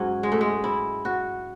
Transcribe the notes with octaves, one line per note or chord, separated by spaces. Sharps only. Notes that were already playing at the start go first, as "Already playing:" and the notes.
Already playing: G#2 F#3 C#4
G#3
A3
G#3
E4
F#4